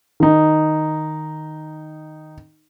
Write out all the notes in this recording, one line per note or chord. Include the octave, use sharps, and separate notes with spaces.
D#3 D#4